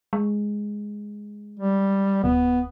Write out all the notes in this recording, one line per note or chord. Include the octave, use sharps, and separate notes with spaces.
G#3
G3
D1 B3